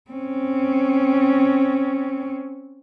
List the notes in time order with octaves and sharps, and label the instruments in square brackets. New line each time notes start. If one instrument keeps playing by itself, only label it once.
[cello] C4 C#4